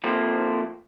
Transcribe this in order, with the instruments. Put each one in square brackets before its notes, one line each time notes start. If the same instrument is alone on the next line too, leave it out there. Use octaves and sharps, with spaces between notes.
[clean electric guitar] F3 A3 A#3 C4